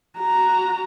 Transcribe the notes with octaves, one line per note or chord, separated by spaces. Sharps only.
F#4 A#5